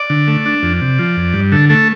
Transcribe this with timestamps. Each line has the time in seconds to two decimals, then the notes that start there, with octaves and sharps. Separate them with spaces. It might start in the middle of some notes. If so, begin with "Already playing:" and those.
Already playing: D5
0.10 D3
0.28 A3
0.46 D4
0.63 F2
0.81 C3
0.99 F3
1.17 F2
1.33 G2
1.52 D3 A4
1.69 A3 A4